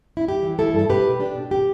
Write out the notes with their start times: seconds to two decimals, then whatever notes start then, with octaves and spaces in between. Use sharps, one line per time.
0.17 E4
0.27 G2 G4
0.43 E3
0.59 A3 E4 A4
0.74 G2
0.79 A4
0.89 B2 G4 B4
1.04 A3
1.20 D4 G4
1.35 B2
1.51 G4